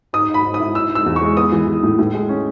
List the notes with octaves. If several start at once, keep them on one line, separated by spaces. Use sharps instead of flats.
G#2 D#6
G#2
B5
G#2
D#6
E4
D#4 E6
D#4
E6
E2
C#6
G#3
B3 D#6
E3
E3
A2
A2
G#3
C#4